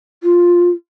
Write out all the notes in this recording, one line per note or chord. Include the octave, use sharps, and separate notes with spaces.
F4